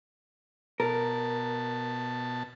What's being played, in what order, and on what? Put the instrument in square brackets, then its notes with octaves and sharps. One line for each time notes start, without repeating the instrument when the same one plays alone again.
[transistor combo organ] B2 A5 [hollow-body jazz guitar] A#4